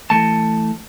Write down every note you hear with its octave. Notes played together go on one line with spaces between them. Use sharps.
E3 A3 A5